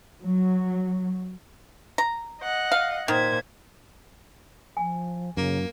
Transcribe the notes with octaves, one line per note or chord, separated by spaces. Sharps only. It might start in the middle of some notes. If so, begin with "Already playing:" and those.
F#3
A#5
D#5 F#5
F5
A#2 D#3 C5 G#6
F3 G#5
F#2 C#3 A#3